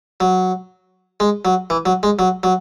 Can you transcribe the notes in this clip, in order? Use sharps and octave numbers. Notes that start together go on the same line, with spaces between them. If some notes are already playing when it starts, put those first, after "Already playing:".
F#3
G#3
F#3
E3
F#3
G#3
F#3
F#3